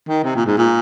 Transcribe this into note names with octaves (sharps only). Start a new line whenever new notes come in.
D#3
C3
A#2
G#2
A#2